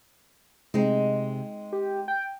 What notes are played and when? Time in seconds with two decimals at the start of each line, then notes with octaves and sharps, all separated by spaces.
0.74 C3 G#3 C4 D#4
1.73 G4
2.08 G5